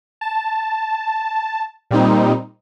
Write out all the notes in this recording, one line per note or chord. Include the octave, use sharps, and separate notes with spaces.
A5
A#2 G3 C4 D#4